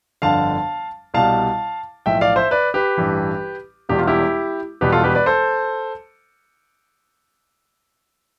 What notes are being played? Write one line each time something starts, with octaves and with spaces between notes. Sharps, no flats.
G1 F2 D3 F5 A5
C2 B2 G3 F5 A5
B1 A2 F3 E5 G5
D5 F5
C5 E5
B4 D5
G4 B4
A1 G2 E3
E1 E2 B2 G3 G4
F4
E4 G4
E1 E2 B2 G3 G4 B4
F4 A4
G4 B4
B4 D5
A4 C5